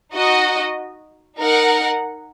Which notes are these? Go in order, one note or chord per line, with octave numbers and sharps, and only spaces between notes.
D#4 F#4 D#5
D#4 A#4 F#5